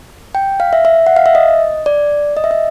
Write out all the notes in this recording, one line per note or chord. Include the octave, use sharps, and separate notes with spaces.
G5
F5
E5
E5
F#5
F5
E5
D#5
D5
D#5
E5
D#5